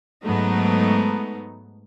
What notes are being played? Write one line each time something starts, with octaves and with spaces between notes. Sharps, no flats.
G#2 F#3 A3 B3 D#4